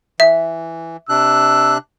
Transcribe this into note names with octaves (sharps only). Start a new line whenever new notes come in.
E3 E5
C3 D4 E6 F#6